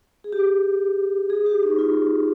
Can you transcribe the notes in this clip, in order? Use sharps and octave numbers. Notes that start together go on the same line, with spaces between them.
G#4
G4
G#4
G4
D#4
F4